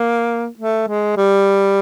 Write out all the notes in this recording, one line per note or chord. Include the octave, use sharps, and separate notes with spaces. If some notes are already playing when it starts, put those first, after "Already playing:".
Already playing: A#3
A3
G#3
G3